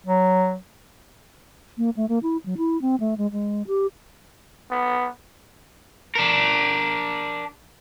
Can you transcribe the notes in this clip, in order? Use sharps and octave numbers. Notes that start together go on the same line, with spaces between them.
F#3
A#3
A3
A#3
E4
F#3
E4
C4
A3
G#3
G#3
G4
B3
D4 A#4